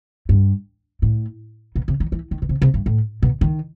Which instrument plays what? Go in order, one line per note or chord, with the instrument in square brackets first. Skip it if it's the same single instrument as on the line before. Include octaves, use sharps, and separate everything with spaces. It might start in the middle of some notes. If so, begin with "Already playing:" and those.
[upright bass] G2
A2
B2
C3
D#3
E3
D#3
B2
C3
C3
G2
A2
B2
D#3